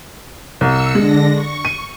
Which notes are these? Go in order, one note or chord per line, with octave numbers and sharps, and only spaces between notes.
C2 E6 C#7
D3 G#3 D4 A#6
C#6
D#7